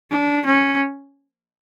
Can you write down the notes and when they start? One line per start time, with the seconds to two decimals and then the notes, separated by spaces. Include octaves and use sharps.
0.11 D4
0.46 C#4